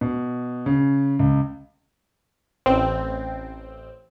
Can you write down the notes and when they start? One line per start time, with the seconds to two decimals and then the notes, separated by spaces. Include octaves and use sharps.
0.01 B2
0.66 C#3
1.19 C#2
2.66 A1 C4